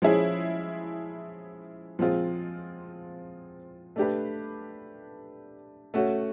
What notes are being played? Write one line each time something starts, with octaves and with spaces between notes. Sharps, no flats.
F3 G#3 C#4 E4 G#4
F3 G#3 C4 F4
A3 D4 G4 B4
A3 C#4 F#4